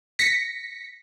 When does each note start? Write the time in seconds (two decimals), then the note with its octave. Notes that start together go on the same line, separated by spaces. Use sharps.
0.19 A#6 B6 C#7